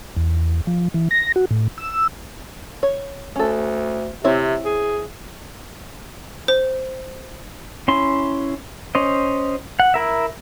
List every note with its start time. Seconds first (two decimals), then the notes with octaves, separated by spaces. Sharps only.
0.17 E2
0.67 F3
0.94 E3
1.11 A#6
1.36 F#4
1.51 A2
1.78 E6
2.83 C#5
3.36 D2 C#4 A4
4.24 C3 C4 E4 C#5
4.65 G#4
6.48 C5
7.88 C#4 E4 C6
8.95 C#4 C5 D#5
9.80 F#5
9.94 E4 A#4 E5